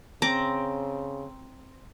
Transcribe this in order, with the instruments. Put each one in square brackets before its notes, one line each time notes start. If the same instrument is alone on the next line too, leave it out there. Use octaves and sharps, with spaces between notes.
[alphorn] C#3 [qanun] C4 D6 [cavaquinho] A#5